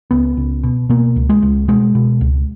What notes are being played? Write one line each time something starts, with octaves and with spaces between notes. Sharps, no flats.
C#2 B3
C#2
B2
B2 A#3
C#2
G#3
C#2
B2 G#3
B2
C#2